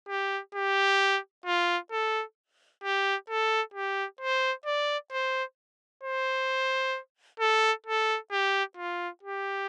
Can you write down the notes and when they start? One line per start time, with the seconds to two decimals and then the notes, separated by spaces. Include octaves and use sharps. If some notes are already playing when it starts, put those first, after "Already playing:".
0.09 G4
0.55 G4
1.46 F4
1.92 A4
2.84 G4
3.30 A4
3.74 G4
4.21 C5
4.66 D5
5.12 C5
6.04 C5
7.40 A4
7.86 A4
8.32 G4
8.77 F4
9.23 G4